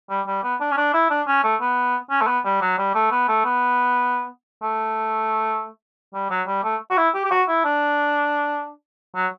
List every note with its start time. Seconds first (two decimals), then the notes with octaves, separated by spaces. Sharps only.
0.10 G3
0.27 G3
0.44 B3
0.60 D4
0.71 C#4
0.77 D4
0.94 E4
1.10 D4
1.27 C#4
1.44 A3
1.61 B3
2.11 C#4
2.21 A3
2.27 B3
2.45 G3
2.61 F#3
2.78 G3
2.95 A3
3.12 B3
3.28 A3
3.45 B3
4.62 A3
6.14 G3
6.30 F#3
6.47 G3
6.64 A3
6.90 F#4
6.97 E4
7.14 G4
7.25 G4
7.31 F#4
7.48 E4
7.64 D4
9.15 F#3